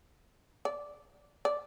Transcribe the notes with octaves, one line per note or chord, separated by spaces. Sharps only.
D5
D5